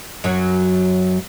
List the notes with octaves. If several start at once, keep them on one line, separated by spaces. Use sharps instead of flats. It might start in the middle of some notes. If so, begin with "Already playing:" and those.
F#2 F#3